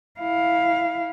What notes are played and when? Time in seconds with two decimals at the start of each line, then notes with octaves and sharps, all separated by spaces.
0.20 E4 F5